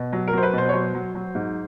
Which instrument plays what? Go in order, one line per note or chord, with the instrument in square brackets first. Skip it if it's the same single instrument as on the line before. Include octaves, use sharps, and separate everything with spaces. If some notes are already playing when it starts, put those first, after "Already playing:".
Already playing: [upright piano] B2
F#3
A#4
F#3 C5
B4
B2 C5
C#5
F#3 C5
F#3
F#3
G#2